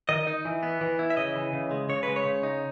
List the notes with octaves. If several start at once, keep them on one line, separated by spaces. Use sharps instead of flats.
D#3 D#5
D#4
E3
B3
E3
E4
E5
C#3 D#5
E3
C#3
G#3
C#3 C#5
G#3 B4
C#5
C#3
D#4